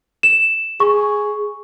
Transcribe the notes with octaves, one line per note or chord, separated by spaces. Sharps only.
E7
G#4 C#6